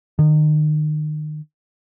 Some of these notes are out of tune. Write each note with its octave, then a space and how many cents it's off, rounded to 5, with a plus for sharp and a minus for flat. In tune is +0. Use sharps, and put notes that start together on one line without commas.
D#3 -35